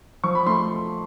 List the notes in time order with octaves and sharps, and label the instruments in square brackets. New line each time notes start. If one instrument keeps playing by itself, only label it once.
[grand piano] F3 C#6
B5
A3 C6